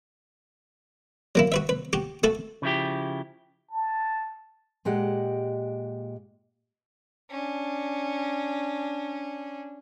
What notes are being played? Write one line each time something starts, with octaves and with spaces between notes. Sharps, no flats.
F#3 A#3 E4
F#4 B4 E5
B4
F#4 G4
A3 F#4 A4
C#3 F3 E4 G4
A5
A#2 G#3 G4 D#5 F#5
C#4 D4